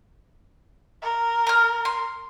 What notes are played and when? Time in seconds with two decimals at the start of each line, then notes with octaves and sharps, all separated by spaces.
1.02 A#4
1.47 A#5 F6
1.85 C6